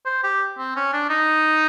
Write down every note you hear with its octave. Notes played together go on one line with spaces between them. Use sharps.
C5
G4
C4
C#4
D4
D#4